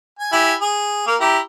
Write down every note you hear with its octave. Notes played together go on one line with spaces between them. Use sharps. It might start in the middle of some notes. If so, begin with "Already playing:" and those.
G#5
E4 G4 G#5
G#4
A#3 A#4
E4 G4 A#5